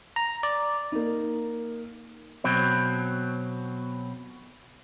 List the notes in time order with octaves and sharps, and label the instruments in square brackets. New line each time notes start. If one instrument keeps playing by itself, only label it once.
[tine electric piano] A#5
D5
[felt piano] A#3 D#4
[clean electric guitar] B2 F#3 C4